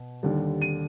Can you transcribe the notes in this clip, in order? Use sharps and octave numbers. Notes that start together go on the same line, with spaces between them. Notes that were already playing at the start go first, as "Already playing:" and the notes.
Already playing: B2
D#2 D3 G3
D#7